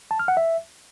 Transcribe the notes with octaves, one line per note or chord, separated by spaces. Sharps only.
A5
F6
F#5
E5